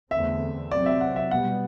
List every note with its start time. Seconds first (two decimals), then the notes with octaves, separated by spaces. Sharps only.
0.11 E2 D3 A3 C4 E5
0.71 C3 F#3 C4 D5
0.86 E5
1.01 F#5
1.16 E5
1.31 B2 G3 B3 F#5